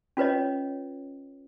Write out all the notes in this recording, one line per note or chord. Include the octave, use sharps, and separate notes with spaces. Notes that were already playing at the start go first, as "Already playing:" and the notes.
C#4 F4 B4 C#5 D#5